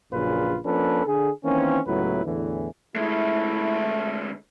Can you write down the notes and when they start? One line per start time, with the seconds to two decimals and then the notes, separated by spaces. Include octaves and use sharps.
0.12 A#1 F#2 A#2 C#3 F4 B4
0.65 F3 A#3 C#4 D4 A4 B4
1.06 D3 G#4
1.44 D#3 E3 A#3 C4 C#4
1.87 C#2 A2 F#3 B3 E4 B4
2.25 E2 A2 D3 E3
2.96 D2 G#3 A3 E4